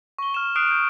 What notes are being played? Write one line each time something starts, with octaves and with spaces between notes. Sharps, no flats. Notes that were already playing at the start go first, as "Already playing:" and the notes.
C#6 G7
F6 E7
D#6 F6 F#6 C7 D7 E7
G6 D7